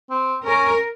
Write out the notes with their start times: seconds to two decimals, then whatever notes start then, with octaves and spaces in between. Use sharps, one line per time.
0.10 C4
0.46 C#4 A#4